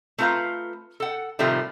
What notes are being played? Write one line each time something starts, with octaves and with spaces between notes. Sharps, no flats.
A3 C4 F4 B4 F5 A#5
A4 F#5
A2 C3 D#3 F3 G3 A3